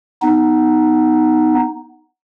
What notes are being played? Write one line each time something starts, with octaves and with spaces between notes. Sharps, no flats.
B3 D#4